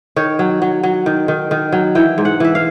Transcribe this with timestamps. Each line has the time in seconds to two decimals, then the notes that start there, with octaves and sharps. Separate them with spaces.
0.16 D#3 C#5
0.39 F#3
0.62 F#3
0.83 F#3
1.06 D#3
1.28 D#3
1.51 D#3
1.72 F#3
1.95 E3 G5
2.18 G#2
2.25 F#5
2.40 E3 E5
2.55 F5